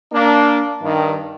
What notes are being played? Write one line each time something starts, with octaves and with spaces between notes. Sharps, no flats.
A#3 D4
G2 D#3